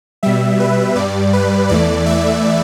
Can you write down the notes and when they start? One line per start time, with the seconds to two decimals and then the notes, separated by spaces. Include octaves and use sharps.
0.23 B2 G3 E5
0.60 B4
0.96 G2 G3 D5
1.33 B4
1.69 E2 E3 A3 D5
2.06 E5